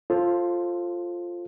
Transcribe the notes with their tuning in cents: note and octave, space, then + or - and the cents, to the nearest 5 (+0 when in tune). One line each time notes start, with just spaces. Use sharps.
F4 +0 A4 +0 C5 +20